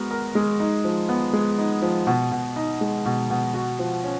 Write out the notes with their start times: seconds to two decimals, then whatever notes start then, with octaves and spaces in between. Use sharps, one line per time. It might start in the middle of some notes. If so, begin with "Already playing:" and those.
Already playing: G#3 B3 F#4 A#4
0.11 A#4
0.35 G#3
0.60 D#4
0.84 F3
1.09 B3
1.33 G#3
1.59 D#4
1.82 F3
2.07 B2
2.31 B2
2.56 D#4
2.81 G#3
3.06 B2
3.30 B2
3.54 F#4
3.79 F3
4.04 C#4